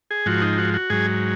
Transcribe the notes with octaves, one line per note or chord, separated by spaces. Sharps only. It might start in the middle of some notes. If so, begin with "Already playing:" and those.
G#4
G#2 F3 F#4
D#4
F#4
F#4
G#2 F#3 G#4